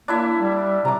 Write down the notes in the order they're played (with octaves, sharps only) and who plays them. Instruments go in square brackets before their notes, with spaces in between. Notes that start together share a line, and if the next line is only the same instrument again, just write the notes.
[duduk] A#3 [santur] D4 E4 E5
[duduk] G3
[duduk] C3 [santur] A#5 D6